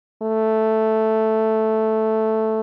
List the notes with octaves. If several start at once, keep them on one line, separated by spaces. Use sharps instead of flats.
A3